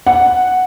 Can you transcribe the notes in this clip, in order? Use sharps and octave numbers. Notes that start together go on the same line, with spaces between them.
F#5